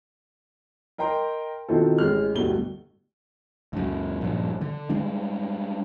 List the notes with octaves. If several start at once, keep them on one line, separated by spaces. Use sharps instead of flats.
A#4 D#5 G5 A#5 C6
B2 D#3 C4 E4 F4 A4
A1 G#3 F6
D1 G2 B2 G3 A3 G7
C#2 F#2
A#1 G2
D3
G3 G#3 D4